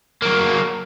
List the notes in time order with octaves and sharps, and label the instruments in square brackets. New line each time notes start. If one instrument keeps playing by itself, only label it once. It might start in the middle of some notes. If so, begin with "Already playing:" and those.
[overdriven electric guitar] F#3 A#3